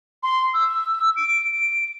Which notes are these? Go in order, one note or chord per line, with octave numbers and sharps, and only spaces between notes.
C6
E6
D7
D7